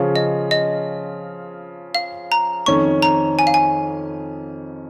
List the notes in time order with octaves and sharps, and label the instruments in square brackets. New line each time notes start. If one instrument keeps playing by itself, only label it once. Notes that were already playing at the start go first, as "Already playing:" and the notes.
Already playing: [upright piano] C#3 F3 C#4 F4
[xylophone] D#5
D#5
F5
A#5
[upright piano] F2 D#3 C#4 [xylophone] C#6
[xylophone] A#5
G#5
F5
G#5